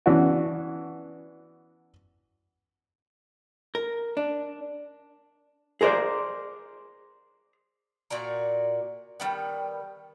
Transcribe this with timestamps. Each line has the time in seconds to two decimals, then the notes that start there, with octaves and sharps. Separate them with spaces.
0.06 E3 B3 C#4 D4 F#4
3.75 A#4
4.17 D4
5.81 G#4 A#4 C5 D5
8.10 A#2 F#4 D5 A#5
9.20 D#3 G3 B3